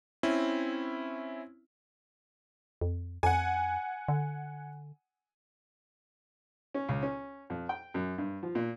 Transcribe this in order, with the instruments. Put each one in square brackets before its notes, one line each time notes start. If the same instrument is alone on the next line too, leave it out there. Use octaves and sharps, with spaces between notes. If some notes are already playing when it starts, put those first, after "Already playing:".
[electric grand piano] C4 C#4 E4
[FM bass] F2
[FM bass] F2 [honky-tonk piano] F#5 G#5
[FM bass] D3
[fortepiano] C#4
C#2
C#4
F2
G5
F#2
G2
F3
A#2